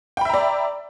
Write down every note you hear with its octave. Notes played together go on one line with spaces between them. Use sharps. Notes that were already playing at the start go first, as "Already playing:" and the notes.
D5 E5 G5 A#5 B5